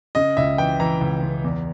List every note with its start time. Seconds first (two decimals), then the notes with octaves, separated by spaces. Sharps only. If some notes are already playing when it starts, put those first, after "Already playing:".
0.15 C#3 D#5
0.37 C#2 E5
0.58 E3 G5
0.80 E3 A#5
1.01 C#2
1.23 C#2
1.44 E2